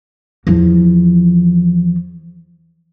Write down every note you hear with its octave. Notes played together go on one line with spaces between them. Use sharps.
E2 F3